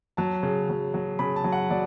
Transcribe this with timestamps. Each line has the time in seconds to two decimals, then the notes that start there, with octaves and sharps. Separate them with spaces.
0.17 F#3 A5
0.43 C#3
0.69 F#3
0.94 F#3
1.19 C#3 B5
1.36 A5
1.44 F#3
1.52 F#5
1.70 F#3 D5